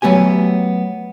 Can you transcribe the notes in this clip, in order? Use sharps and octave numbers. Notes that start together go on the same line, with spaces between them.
F#3 A3 B3 G4 G#5